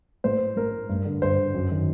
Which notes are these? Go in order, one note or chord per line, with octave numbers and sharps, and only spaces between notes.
A2 C5
A2 A#4
G2
D3
G2 C5
D3
F#2
D#3